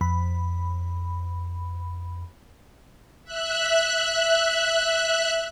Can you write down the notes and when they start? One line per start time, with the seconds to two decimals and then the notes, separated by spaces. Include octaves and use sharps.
0.01 F2 B5
3.24 E5 F#6